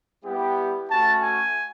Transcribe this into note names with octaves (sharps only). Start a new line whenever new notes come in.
G3 B3 E4 G4
A3 C#4 F#4 A5
G#5